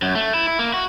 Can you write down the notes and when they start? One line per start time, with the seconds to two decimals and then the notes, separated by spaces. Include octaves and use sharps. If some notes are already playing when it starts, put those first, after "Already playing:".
0.02 F#2
0.15 A3
0.34 E4
0.48 E4
0.59 A#3
0.74 F#4